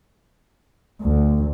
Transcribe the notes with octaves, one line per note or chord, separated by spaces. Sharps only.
D2